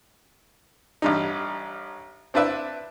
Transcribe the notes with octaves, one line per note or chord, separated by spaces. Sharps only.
A1 G2 D#4
C4 D4 E4 B4 E5